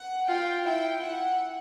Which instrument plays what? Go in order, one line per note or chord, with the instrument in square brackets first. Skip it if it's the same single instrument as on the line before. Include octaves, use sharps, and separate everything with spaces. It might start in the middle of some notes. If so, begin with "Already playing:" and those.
Already playing: [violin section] F#5
[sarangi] F4 [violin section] G5
[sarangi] E4 [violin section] G5
[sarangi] E4 [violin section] F#5